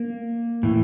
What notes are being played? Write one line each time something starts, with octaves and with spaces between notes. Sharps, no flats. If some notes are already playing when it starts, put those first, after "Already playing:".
Already playing: A#3
A2 E3